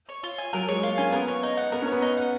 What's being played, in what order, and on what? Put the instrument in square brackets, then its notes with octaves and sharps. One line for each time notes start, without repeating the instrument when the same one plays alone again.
[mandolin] C#5
F4
G#5
[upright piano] F#3 [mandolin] A#4
[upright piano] G#3 [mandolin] C#5
[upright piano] A#3 [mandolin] F4
[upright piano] C#4 [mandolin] G#5
[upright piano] B3 [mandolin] A#4
[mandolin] C#5
D#4
F#5
[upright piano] B3 [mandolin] A#4
[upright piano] C#4
[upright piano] B3 [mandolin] C#5
[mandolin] D#4
F#5